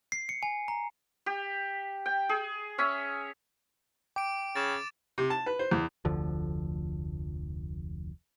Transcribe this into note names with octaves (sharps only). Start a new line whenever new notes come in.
C7
C#7
G#5
A#5
G4
G5
G#4
C#4 C#5 E5
G5 D6 D7
C#3 A6 E7
C3
A5
B4
C5
E2
F1 D2 D3 F3